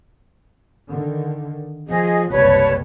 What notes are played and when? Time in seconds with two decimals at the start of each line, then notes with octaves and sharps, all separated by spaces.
0.88 D3 D#3
1.87 F3 G#4 D#5
2.30 F#1 C2 G3 B4 C#5 A5